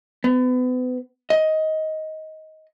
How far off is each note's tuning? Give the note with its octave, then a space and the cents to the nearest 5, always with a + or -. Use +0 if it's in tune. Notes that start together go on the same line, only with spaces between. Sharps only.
B3 +35
D#5 +15